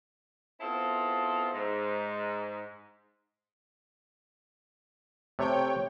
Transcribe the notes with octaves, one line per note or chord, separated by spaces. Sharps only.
B3 C4 E4 F4 G#4 A4
G#2
C3 A3 C#5 G5